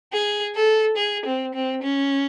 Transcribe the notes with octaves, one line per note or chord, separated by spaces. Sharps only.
G#4
A4
G#4
C4
C4
C#4